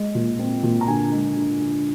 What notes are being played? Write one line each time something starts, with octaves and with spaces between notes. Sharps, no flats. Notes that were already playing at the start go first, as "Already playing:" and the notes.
Already playing: G#3
A#2
C4
A#2
A#5
D3 G#5
G#3
D3
D3